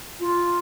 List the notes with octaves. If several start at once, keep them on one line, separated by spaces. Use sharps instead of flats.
F4